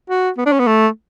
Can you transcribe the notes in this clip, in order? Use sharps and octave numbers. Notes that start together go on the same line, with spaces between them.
F#4
B3
D4
C#4
B3
A3